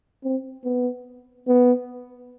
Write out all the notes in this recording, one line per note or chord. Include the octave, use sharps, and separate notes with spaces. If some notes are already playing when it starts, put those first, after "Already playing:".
C4
B3
B3